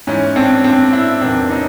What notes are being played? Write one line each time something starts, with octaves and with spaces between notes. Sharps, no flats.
G#2 E3 C#4
C4 D4
C4 D4
D4 E4
E2 C3 D#3 F#3 C4 D4
C#4 D#4